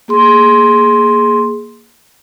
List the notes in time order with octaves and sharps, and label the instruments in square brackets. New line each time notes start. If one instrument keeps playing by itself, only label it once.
[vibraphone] A#3 G#4 C6